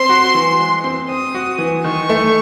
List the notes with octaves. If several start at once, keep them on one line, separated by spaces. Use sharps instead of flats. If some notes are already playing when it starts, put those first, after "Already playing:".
Already playing: C4 C6
F#4
E3
G#3
C4
C4 D#6
F#4
E3
D#3 C#6
A3